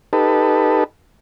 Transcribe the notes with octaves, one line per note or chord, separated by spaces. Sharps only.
D#4 G4 A4 B4